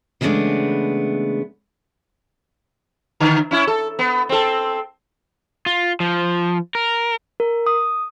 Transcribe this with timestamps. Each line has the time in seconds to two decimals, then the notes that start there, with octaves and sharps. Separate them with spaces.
0.21 C#3 E3 G#3 A3 B3 D4
3.20 D3
3.51 C#4 E4
3.67 A4
3.99 B3
4.29 C4 A4
5.66 F4
6.00 F3
6.75 A#4
7.40 A#4
7.67 D#6